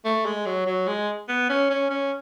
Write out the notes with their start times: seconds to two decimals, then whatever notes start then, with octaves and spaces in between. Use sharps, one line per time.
0.05 A3
0.26 G#3
0.46 F#3
0.67 F#3
0.88 G#3
1.29 B3
1.49 C#4
1.70 C#4
1.90 C#4